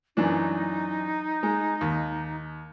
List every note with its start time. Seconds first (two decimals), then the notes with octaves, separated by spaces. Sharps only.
0.17 F#2 E3 D4 D#4
1.43 G#3
1.81 D#2